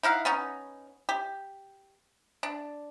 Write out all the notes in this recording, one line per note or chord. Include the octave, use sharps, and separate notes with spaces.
D#4 E4 F5 F#5
B3 C#4 D#4
G4
D4